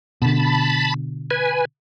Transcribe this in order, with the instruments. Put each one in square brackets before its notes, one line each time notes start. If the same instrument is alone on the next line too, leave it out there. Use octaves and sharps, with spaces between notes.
[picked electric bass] B2 D3 [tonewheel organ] A5 B5
[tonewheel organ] B4 G#5